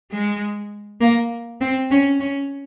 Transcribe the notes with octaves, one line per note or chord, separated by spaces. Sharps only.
G#3
A#3
C4
C#4
C#4